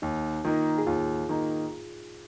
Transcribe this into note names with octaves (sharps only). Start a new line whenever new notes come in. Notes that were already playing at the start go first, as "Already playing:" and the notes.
D#2 D#4
D#3 A#3 D#4 F4
G#4
D#2 F4
D#3 A#3 D#4